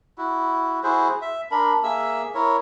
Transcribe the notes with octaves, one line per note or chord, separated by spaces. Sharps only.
E4 F#4
E4 F#4 G#4 C5
E5
D4 A#4 B5
A#3 G#4 E5 E6
E4 A#4 C#5